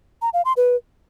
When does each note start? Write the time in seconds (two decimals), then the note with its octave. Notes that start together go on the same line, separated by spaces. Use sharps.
0.22 A#5
0.33 F5
0.45 C6
0.57 B4